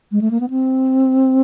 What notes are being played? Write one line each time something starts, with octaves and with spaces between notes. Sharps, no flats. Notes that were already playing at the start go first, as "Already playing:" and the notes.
G#3
A3
A#3
B3
C4